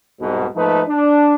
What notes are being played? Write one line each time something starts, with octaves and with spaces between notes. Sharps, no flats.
C2 G#2 B2
G#2 F3 A3 A#3 D#4 B4
D4